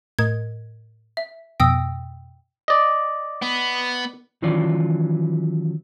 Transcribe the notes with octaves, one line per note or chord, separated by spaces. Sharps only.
A2 A#4 D#5 G#6
E5
F2 B2 G5 D#6 E6 A#6
D5 D#5
B3
D#3 E3 F#3 C#4 F4 D5